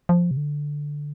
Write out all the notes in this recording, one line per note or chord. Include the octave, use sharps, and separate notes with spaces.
F3
C3
D3